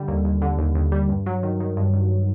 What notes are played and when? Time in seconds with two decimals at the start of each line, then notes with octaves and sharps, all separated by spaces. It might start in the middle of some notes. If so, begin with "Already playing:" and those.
Already playing: D3 G3
0.08 D#2
0.24 D#2
0.42 D3
0.58 D#2
0.75 D#2
0.92 G3
1.09 G2
1.26 F#3
1.43 D#3
1.60 D#3
1.77 G2
1.93 G2